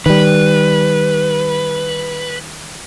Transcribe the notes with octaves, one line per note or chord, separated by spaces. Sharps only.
D#3 G3 B4